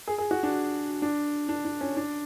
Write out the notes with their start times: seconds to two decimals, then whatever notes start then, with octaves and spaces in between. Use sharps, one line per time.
0.08 G#4
0.18 G#4
0.31 F#4
0.43 D4
1.02 D4
1.49 D4
1.65 D4
1.81 C#4
1.97 D4